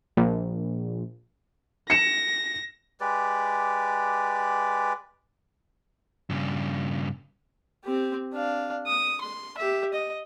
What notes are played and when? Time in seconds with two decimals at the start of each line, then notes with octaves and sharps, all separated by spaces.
0.17 A#1
1.90 A#6 C#7 E7
3.01 G#3 G4 B4 D5
6.30 G2 C#3
7.84 C4 G4
8.33 D4 F5
8.87 D#6
9.21 C6
9.58 G4 E5
9.94 D#5